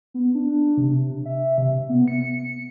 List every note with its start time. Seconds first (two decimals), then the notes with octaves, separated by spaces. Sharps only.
0.14 B3
0.35 D4
0.77 C3
1.26 E5
1.58 C3
1.89 B3
2.08 C#7